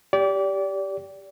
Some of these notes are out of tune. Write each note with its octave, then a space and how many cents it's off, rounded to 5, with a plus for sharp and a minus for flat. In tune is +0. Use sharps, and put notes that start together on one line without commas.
G4 +0 D5 -30